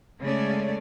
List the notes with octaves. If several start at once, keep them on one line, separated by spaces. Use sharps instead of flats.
C#3 G#3 A3 C#4 D5